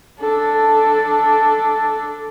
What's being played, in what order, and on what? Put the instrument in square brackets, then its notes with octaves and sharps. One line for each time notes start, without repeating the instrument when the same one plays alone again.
[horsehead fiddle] D4 A4